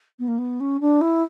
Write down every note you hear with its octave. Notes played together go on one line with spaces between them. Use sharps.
B3
A#3
B3
C#4
D4
E4